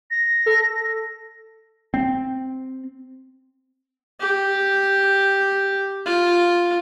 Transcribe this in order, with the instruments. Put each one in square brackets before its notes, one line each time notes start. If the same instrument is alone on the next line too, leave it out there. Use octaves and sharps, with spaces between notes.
[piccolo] A#6
[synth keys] A4
[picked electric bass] C4
[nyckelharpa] G4
F4